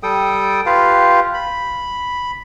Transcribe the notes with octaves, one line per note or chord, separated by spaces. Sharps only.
G3 A4 G5 D#6
F4 G4 B4 F5
B5